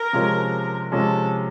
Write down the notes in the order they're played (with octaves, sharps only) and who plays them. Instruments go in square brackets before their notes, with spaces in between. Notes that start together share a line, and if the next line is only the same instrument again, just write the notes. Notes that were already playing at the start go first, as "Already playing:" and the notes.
Already playing: [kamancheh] A#4
[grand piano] C3 F3 G#3 C#4
[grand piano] C3 F3 G#3 C#4 [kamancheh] A4